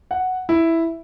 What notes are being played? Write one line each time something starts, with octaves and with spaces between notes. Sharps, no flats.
F#5
E4